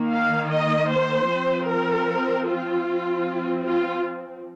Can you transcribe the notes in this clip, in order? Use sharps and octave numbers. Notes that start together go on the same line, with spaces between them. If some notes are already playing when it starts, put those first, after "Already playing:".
Already playing: D#3 A#3
F5
D#5
C5
F3 C4
A#4
F4
F3 C4
F4